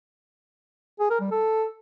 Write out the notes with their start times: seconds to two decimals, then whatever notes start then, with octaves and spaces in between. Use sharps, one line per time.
1.00 G#4
1.10 A#4
1.21 G3
1.31 A4